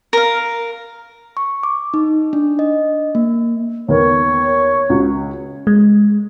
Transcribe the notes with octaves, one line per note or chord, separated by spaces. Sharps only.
A#4 F5
C#6
D6
D#4
D4
D#5
A#3
D#2 B3 A#4 C#5
C#2 F#4
G#3